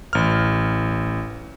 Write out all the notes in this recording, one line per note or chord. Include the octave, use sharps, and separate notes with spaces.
A1 F6